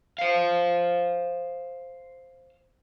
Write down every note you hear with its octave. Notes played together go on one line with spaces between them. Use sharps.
C5 F5